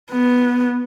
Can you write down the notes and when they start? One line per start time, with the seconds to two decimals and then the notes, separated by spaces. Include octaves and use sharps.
0.12 B3